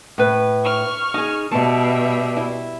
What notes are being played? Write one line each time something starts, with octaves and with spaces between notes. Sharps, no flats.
A2 B4
C#6 F6
D#4 G#4
B2 G3 E5 A5
E4